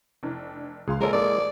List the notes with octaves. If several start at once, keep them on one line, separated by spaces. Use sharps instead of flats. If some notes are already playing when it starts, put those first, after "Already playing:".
F1 E3 D4
C#2 G#4 F5 C6
G#3 A#3 A4 A#4 C#5 D5
A1 A#3 D5 D#6